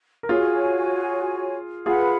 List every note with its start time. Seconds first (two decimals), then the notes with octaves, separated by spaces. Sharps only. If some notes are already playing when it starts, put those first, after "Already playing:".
0.23 A#4
0.29 F4 F#4 G#4 C#5 G#5
1.86 F4 G#4 B4 F#5 B5